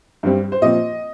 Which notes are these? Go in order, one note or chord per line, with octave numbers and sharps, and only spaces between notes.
G2 G3 C4
C5
A#2 F3 C4 D#5